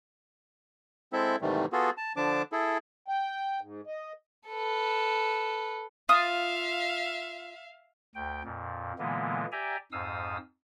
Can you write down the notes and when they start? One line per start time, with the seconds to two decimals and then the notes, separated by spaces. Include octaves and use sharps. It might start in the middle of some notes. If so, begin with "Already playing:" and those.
1.13 G#3 C4 E4 A4 E5
1.42 G#2 C3 D#3 E3 G3 A3
1.72 B3 F4 F#4 G#4 A4
1.97 A5
2.16 D3 F3 D4 A5 D6
2.52 E4 G#4 A4
3.08 G5
3.61 G#2
3.87 D#5
4.49 A4 B4
6.09 F4 E5 F5 D#6
8.15 D2 G5
8.44 F2 A#2
8.99 A#2 D3 E3 G#3 A#3 B3
9.52 G4 D5 E5 G5 G#5 A#5
9.92 F2 G#2 F5 D#6 E6